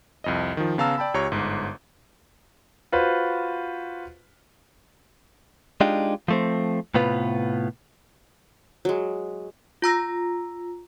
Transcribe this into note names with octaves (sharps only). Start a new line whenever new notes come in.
C2 F2 D#5
D#3 F3
C#3 B3 F5 A5 A#5 E6
D5 G5 A5 B5
C#2 G4 C#5 A#5 C#6
G1 G#2
F4 F#4 B4 C5
G#3 D4 D#4 F4 G4
F3 A3 C4
A2 C3 B3 F4 B4
F#3 G#3
F4 A#5 E6 A#6